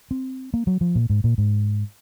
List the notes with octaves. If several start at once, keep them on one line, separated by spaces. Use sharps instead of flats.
C4
A#3
F#3
F3
A#2
G#2
A#2
G#2